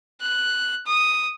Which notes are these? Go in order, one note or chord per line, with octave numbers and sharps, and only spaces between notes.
F#6
D#6